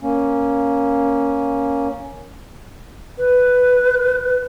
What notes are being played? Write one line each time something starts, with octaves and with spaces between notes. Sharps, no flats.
A#3 C#4
B4